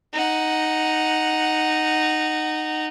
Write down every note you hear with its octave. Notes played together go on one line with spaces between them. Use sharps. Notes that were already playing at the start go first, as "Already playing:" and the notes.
D#4 F#5